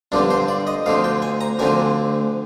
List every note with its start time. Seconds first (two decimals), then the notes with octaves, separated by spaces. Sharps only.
0.12 G2 D3 F3 C4 D4
0.30 C5
0.48 D5
0.67 D#5
0.86 D2 D3 F3 C4 F5
1.04 G5
1.22 G#5
1.41 A#5
1.59 D2 D3 F3 C4 G#5